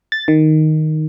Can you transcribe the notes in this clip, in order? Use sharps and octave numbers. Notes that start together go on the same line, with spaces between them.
A6
D#3